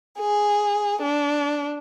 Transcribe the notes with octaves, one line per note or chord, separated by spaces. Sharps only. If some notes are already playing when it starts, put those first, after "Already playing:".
G#4
D4